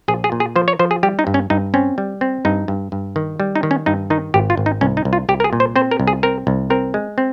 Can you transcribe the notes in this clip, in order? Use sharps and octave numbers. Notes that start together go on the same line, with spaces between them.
A#1 G#4
G#4
A#2
G#4
F3 C5
C#5
F3 C5
G#4
G3 G4
D#4
G2
C#4
G2 D#4
C4 C#4
G3
C4
G2 D#4
G2
G2
D#3
G3
D#4
D#3
C#4
G2 D#4
D#3 D#4
G#1 G4
F4
G#1
D#4
C2 C#4
D#4
C2
F4
C2 G4
A#4
G#4
A#2
C5
C4 C5
A#4
C2
G#4
C4 A#4
C2
C4 A#4
G#3
C4